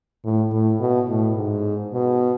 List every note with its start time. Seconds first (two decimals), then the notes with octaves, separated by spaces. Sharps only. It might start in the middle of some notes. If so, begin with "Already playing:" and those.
0.24 A2
0.52 A2
0.80 B2
1.08 A2
1.36 G#2
1.93 B2